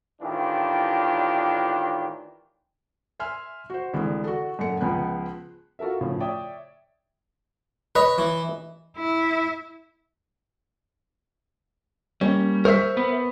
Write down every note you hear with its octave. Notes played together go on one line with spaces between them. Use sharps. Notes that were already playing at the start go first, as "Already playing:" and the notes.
A2 D#3 E3 D4 F4 G4
E5 G#5 C6 F6
F#4 C5
C2 D3 E3 G#3
F#4 A4
F#2 A#2 A4 F#5 C#7
C#2 F3 G#3 B3 G#5 F#6
F4 F#4 A4 A#4 E5
A2 C#3 F3
C#5 D5 E5 G5 D#6
B4 C#5 D#5
E3
E4
G3 A#3 C#4
A#4 C5 E5 C#6 B6
B3